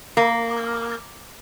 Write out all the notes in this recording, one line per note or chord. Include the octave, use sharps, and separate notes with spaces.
A#3